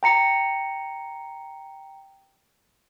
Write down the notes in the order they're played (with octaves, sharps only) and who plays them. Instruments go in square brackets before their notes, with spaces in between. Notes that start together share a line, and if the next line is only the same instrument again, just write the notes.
[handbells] G5 A#5 C#7